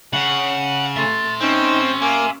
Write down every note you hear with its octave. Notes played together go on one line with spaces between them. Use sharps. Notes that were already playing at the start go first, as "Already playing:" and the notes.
C#3 F#5
A3 E5 C6 A6
C4 C#4 D#4
A#3 G#5